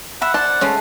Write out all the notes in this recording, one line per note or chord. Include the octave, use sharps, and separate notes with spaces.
E5 F#5 B5
C5 D5 A5
G#3 A3 C#4 C5